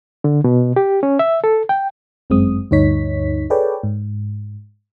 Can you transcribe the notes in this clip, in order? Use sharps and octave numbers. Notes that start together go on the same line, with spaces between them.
D3
B2
G4
C#4
E5
A4
G5
G1 F#2 G#3 C4 D#6
D2 G2 D#4 C#5 B6
G#4 A4 B4 C#5 D5 G5
G#2